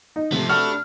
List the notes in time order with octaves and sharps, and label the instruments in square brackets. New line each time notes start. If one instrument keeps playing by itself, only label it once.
[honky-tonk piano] D#4
[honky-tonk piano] C3 A3 [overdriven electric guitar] F3 B3
[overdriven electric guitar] D4 [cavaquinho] F#4 A4 B4 [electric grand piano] F6